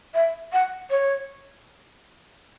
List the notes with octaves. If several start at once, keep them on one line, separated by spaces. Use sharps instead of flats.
E5
F#5
C#5